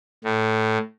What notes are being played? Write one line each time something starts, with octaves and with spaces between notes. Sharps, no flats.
A2